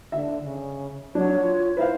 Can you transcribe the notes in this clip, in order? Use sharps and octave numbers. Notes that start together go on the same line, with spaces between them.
D3 E5
C#3
F#3 D4 C#5
F4
E4 B4 C5 E5 F5